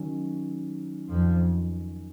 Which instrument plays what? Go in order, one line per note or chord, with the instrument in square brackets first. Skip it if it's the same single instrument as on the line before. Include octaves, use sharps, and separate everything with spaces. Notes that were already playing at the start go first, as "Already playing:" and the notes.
Already playing: [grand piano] D#3 F#3 C#4
[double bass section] F2 F3